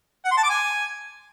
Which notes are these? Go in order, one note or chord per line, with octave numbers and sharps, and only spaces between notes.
F#5
C6
A5
D6
G#5